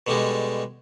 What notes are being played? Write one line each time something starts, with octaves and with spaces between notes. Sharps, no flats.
B2 D3 G3 G#3